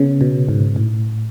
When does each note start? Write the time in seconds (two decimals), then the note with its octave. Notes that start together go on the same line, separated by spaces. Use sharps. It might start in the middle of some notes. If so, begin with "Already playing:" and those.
Already playing: C#3 B3
0.21 B2
0.49 G#2
0.76 A2